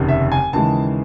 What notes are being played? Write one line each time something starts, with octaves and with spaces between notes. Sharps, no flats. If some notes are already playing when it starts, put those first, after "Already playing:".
Already playing: F1 D#2 C#3
E5
G#5
D#2 C#3 E3 G#3 A5